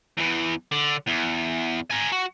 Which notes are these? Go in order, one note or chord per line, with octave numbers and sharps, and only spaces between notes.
E2 E3
D3
E2
A#4 G#5
F#4